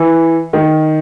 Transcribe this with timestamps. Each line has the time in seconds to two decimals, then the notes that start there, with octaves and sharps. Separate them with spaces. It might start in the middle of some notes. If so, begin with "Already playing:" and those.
Already playing: E3
0.53 D#3